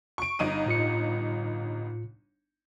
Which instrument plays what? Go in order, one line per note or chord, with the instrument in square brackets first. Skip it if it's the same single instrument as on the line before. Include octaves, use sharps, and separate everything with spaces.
[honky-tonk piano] C#6 D7
G1 D#4 D#7
[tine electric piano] A2 F4 C#7